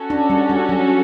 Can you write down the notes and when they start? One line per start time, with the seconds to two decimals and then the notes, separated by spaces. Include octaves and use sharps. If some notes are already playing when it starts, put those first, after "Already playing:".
Already playing: C#4 F#4 A4
0.10 D4
0.30 G3
0.50 G3
0.69 F#3